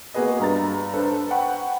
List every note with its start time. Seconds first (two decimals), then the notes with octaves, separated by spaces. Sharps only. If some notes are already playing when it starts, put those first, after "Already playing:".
0.14 A#3 B3 F#4 G#4 B4 D#5
0.40 G2 A#5 A6
0.94 D4 A4 B4 C5
1.31 F#5 G5 B5 C#6